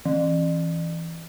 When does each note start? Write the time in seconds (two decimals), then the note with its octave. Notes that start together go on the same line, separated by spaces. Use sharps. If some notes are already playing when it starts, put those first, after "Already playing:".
0.05 E3